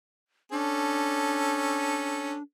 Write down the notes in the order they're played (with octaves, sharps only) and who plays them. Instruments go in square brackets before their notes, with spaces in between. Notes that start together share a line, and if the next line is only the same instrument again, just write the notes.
[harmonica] C#4 A4 [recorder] D4